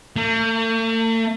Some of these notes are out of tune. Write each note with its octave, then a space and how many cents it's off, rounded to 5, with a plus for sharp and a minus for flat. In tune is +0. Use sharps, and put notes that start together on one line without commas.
A3 +45